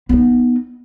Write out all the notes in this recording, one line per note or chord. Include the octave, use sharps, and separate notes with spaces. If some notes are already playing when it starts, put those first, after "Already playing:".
B3 D#4